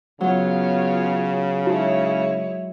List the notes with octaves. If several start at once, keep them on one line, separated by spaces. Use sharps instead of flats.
C#3 F#3 B3 F4 C#5
G#3 D#4 E4 F#4 G4 C#5